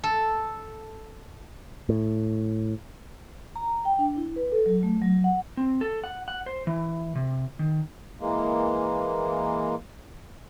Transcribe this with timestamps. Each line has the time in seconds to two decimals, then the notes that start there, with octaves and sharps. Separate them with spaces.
0.04 A4
1.89 A2
3.56 A#5
3.85 G5
3.99 D4
4.16 E4
4.36 B4
4.52 A4
4.66 F#3
4.83 A3
5.02 F#3
5.24 F#5
5.57 C4
5.81 A4
6.04 F#5
6.28 F#5
6.46 C5
6.67 E3
7.15 C3
7.59 D#3
8.20 E3 G#3 A#3